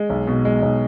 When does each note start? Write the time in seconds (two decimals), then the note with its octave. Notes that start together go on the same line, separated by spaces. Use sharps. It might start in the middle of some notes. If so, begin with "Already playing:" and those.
Already playing: G#3
0.10 B1
0.27 B2
0.45 G#3
0.62 B1